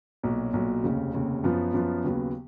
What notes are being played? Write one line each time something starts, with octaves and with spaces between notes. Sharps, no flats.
B1 A#2 F#3
B1 A#2 F#3
F1 D#2 C#3
F1 D#2 C#3
F#2 F3 B3 F4
F#2 F3 B3 F4
D#2 C#3 F#3 B3